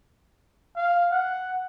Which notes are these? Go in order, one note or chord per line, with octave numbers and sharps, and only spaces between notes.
F5
F#5